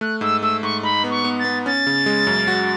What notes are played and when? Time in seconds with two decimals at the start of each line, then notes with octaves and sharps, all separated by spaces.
0.01 A3 F#6
0.21 G#2 E6
0.42 A3 E6
0.63 G#2 C#6
0.83 D#4 B5
1.04 B3
1.10 C#6
1.24 B3
1.39 A6
1.44 B3
1.66 C#4 A6
1.87 C#3
2.06 G#3
2.27 F#2
2.48 F#4